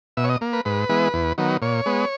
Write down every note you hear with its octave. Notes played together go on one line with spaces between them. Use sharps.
B2 E5
C#5
D#5
A#3
B4
G#2 B4
E3 G#3 B3
E2
D#3 F#3 B3
A#2 C#5
G#3 B3